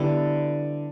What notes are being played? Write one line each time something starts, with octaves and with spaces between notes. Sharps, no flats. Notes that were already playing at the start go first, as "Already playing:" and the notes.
Already playing: D3 G3 B3 E4